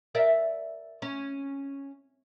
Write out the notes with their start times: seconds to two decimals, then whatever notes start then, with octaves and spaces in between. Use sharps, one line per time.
0.15 A#4 D5 E5
1.02 C#4